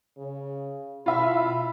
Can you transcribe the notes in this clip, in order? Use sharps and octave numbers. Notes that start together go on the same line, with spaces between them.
C#3
B2 E4 F4 E5 B5